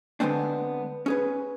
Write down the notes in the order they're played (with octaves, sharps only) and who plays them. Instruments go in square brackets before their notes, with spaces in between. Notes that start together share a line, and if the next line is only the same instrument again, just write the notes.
[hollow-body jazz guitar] D3 G#3 B3 C4 D4
C#4 G#4 B4